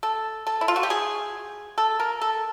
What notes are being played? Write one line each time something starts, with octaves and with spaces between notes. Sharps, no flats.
A4
A4
E4
F4
F#4
G4
G#4
A4
A#4
A4